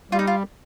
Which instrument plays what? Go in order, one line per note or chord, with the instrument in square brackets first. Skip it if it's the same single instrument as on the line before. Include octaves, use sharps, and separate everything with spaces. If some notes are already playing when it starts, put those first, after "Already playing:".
[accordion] G3 [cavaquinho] F4
[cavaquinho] D#4
F4